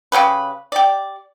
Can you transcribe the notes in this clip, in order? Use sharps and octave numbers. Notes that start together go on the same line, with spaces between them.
C#3 A#3 G4 B4
G4 D5